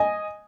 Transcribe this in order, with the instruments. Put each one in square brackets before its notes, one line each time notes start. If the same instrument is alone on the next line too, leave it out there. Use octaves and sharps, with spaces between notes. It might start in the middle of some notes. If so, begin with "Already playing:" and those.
Already playing: [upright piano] D#5 G#5